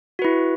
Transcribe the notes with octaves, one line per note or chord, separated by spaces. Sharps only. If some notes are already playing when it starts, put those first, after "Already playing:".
E4 F#4 B4